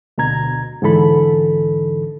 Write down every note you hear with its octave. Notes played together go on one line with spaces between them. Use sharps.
D2 B2 A#5 G#6
G#2 D3 E3 A4 B5